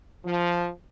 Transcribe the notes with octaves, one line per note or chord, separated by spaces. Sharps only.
F3